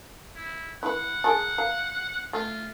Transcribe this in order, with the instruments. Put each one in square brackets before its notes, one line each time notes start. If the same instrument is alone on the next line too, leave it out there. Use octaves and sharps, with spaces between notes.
[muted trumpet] E4
[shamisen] E4 B4 [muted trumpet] F#5
[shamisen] G#4 A#4 A5
F5 A#5
[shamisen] A3 [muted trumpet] F4